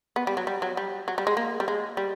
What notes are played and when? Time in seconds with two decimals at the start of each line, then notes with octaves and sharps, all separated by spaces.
0.16 B3
0.27 G3
0.37 F#3
0.47 G3
0.62 F#3
0.77 G3
1.08 F#3
1.18 G3
1.27 G#3
1.37 A#3
1.60 G3
1.68 G#3
1.97 G3